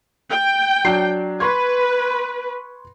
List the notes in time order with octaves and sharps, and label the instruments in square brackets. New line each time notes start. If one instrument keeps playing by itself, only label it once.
[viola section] G5
[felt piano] F#3 D4 C7
[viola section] B4 [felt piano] C6 C#6 G#6